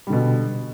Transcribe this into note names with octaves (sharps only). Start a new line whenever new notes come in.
B2 D3 G3